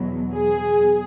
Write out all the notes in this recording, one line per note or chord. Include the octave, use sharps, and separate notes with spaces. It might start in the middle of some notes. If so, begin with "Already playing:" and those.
Already playing: E2 B2 F#3
G#4